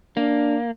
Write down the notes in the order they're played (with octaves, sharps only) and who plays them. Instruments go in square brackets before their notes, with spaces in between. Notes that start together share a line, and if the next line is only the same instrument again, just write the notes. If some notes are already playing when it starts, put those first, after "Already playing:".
[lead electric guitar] A#3 [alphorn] D4